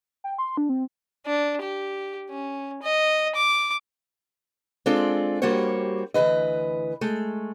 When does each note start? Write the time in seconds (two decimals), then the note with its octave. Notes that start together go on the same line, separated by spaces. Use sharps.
0.24 G5
0.38 C6
0.57 D4
0.69 C4
1.26 D4
1.62 G4
2.30 C#4
2.82 D#5
3.35 D6
4.86 G#3 C4 D4 F4 A4 D5
5.42 G3 A#3 F#4 G4 C5 C#5
6.14 D2 A#2 E3 B4 D#5
7.01 G#3 A3